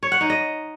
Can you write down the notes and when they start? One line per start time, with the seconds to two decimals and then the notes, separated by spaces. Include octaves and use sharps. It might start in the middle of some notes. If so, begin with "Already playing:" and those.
0.03 C#5
0.12 F#5
0.21 D#4
0.30 D#5